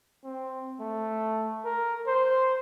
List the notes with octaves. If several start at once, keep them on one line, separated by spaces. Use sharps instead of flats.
C4
A3
A#4
C5